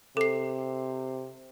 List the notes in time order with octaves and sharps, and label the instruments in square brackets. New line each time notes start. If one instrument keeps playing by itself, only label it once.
[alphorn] C3 [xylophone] A4 C7